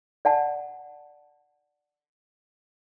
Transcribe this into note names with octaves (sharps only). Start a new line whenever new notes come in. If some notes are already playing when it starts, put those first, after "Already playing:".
D5 F#5 A5